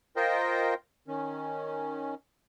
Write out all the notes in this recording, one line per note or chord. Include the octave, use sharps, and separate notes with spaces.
F4 A#4 C5 D#5 G5
D#3 C#4